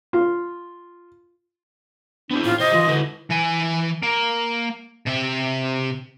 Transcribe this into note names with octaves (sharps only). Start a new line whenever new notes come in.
F4
B3 C4 D4 E4
A2 F4
C3 C5 D#5
E3 F#3 F4
D3 E4 F#4 B4
E3 G#5
A#3
C3 E5